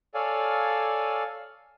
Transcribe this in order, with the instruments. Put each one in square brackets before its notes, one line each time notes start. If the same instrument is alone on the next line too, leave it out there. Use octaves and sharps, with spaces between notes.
[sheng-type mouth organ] A4 C#5 D5 F5 G#5